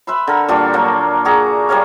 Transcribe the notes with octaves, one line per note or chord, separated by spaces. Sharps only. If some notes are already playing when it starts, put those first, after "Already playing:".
B4 E5 B5 C6
D3 A#4
A#2 G3 D4 F#4
F#3 A#3
F#4 G#4 A#5
G3 A#4 C#5 F5